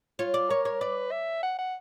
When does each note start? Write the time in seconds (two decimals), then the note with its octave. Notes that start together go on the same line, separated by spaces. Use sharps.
0.19 F4 C#5
0.34 D5
0.50 A#4 C#5
0.65 C#5
0.80 B4 D5
1.11 E5
1.43 F#5
1.59 F#5